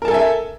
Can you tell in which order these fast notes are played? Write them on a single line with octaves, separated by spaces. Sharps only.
A#4 A5 A4 G#5 E5